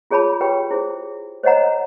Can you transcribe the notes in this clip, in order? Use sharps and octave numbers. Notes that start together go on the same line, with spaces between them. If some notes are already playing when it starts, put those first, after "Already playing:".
F4 G#4 C#5 A5 B5
G4 B4 C#5 G5
E4 G#4 C5
C5 C#5 D#5 F#5 A#5